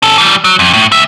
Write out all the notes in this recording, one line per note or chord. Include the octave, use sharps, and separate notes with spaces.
C#4 A4
E3 G3
F#3
F2
A2
C#2 E5